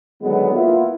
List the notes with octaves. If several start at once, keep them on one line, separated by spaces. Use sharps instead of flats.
D3 D#3 F#3 G#3 B3
A#3 B3 E4 F4